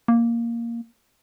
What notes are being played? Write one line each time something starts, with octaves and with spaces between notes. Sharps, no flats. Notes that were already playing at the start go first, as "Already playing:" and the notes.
A#3